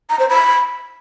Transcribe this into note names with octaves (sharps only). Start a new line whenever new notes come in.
A#5
C5
B5